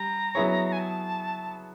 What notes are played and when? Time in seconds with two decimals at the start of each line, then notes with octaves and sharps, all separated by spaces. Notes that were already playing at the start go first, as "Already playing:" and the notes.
Already playing: G3 A#5
0.35 F#3 B3 E4 G#4 C#5
0.72 G#5
0.79 A5